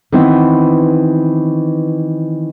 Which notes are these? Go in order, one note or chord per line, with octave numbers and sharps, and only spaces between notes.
D#3 E3 B3 C4 E4